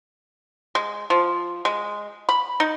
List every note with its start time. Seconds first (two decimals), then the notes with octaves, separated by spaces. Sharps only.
0.75 G#3
1.10 F3
1.65 G#3
2.29 B5
2.60 D#4